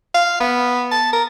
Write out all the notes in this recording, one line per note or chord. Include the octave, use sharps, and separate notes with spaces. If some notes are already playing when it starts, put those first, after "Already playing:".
F5
B3
A5
A#4